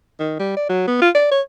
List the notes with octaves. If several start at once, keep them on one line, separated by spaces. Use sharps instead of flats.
D#3
G3
D5
F#3
B3
F4
D5
C#5